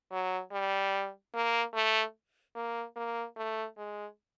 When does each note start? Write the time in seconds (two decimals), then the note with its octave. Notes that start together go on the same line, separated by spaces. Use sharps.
0.12 F#3
0.52 G3
1.34 A#3
1.74 A3
2.56 A#3
2.96 A#3
3.37 A3
3.77 G#3